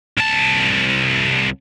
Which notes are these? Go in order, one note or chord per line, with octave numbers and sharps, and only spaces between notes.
C2 A5